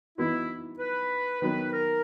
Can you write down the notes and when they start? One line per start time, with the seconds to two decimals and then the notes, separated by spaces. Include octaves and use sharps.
0.18 E3 B3 D#4 E4 F#4
0.79 B4
1.41 D#3 F#3 B3 B4
1.73 A#4